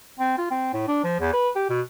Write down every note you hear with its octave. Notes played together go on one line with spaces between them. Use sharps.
C4
F4
C4
A2
D4
F3
E2
B4
G4
B2